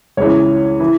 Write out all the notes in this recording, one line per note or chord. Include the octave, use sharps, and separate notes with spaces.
C#2 C#3 E3 C#5
E3